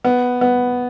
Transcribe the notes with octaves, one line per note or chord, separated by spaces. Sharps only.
B3
B3